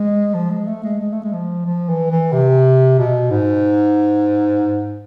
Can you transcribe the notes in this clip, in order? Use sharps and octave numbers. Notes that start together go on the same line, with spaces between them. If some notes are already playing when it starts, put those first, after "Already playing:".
Already playing: G#3
F3
G#3
A3
G#3
G#3
A3
G#3
F3
F3
E3
E3
C3
B2
G#2